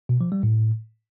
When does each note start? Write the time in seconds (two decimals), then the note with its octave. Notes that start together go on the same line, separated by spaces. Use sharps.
0.09 B2
0.21 F3
0.32 G3
0.43 A2